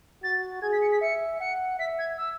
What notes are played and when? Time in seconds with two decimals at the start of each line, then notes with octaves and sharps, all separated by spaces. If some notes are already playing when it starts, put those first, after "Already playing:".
0.23 F#4 A6
0.62 G#4 G#6
0.73 B6
0.82 C#7
0.92 B6
1.01 E5 C#7
1.41 F#5 C#7
1.79 E5 B6
1.99 G#6
2.18 E6